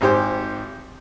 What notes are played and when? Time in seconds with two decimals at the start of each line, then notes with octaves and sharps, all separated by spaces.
0.01 G#1 G#2 G4 C5